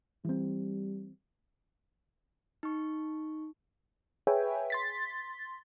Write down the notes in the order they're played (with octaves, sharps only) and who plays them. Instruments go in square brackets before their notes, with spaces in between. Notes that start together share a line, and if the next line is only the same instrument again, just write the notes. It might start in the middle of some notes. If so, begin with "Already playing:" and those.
[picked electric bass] E3 C4 [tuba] G3
[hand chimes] D#4 C#6
[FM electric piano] G#4 B4 C#5 E5 G5 G#5
C6 A6 B6